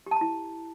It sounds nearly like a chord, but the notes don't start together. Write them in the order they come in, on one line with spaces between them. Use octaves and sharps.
G4 A5 A#5 E4